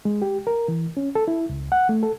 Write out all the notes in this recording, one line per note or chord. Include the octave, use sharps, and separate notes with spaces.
G#3
G4
A#4
E3
C#4
A4
E4
C#2
F#5
A3
A4